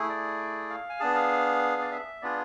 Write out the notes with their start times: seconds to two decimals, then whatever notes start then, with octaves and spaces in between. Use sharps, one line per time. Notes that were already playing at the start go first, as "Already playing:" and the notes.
Already playing: A3 E4 G#4
0.09 D5
0.70 F5
0.89 G#5
1.00 B3 D4 G#4 A5
1.15 F5
1.81 D5
1.91 E5
2.22 B3 D4 F4 G#4 D5